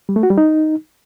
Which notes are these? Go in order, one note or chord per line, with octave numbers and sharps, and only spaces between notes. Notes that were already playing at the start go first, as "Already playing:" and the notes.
G3
A3
F#4
G3
D#4